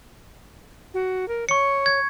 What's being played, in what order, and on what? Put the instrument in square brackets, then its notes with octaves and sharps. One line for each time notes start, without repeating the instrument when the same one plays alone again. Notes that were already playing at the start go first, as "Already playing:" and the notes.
[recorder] F#4
A#4
[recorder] C#5 [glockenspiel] C#6 C#7
[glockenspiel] G#6